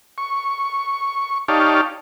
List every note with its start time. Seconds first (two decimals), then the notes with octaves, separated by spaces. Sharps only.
0.18 C#6
1.48 D#4 G4 C#5 D5 F5 A5